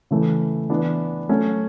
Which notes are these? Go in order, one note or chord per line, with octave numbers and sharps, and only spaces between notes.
C#3 E3 A3
E3 B3 D4
F#3 A3 C#4 F#4